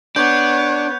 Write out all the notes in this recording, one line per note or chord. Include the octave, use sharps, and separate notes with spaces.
B3 D4 C#5 G6